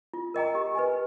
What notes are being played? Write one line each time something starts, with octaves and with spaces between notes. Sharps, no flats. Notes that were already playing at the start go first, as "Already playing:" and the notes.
F4
A#4 D#5 G5 A#5
G4
B4 D#5 G#5